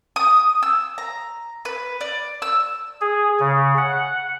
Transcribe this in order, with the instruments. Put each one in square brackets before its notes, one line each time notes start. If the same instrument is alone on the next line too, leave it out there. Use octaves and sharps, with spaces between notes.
[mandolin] D#6
E6
A#5
B4
D5
E6
[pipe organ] G#4
C#3
F#5